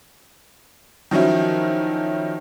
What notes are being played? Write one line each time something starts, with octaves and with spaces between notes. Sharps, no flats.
D#3 F3 F#3 C#4 E4